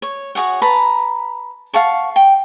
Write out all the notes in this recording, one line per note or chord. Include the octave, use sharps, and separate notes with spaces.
C#5
F#4 G#4 C#5 F#5
B4 A5 A#5
F5 F#5 A5 C#6
G5